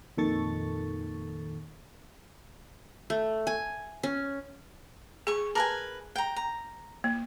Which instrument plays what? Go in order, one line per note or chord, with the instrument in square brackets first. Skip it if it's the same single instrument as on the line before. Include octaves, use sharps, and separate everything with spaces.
[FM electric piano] F2 A#2 D#3 A4 C#6 A6
[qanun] A3
G#5
C#4
[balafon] G#4 [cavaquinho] G#5 C#6
[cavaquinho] A#4 B4 G#5 [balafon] A5
[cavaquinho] G5 A#5
A#5
[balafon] A#3